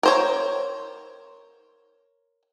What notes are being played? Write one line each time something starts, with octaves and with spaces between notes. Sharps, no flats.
A#4 C5 C#5